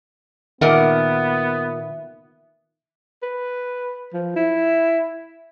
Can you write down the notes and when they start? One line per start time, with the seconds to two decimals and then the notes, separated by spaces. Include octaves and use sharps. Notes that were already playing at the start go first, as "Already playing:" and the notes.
0.61 A#2 D#3 B3 A#4 E5 F#5
3.22 B4
4.13 F3
4.36 E4